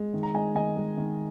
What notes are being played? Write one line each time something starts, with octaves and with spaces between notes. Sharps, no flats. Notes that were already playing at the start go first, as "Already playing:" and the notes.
Already playing: G#3
D#3
A#5
G#3 D#5 G#5
D#3 D#5 G#5
G#3
D#3